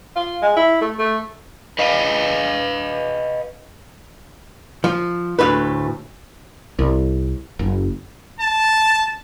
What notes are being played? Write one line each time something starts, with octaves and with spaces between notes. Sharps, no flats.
F4
G#3
E4
A3
A3
B4 D#5 F5
F3
D2 A2 B4
C2
F#1
A5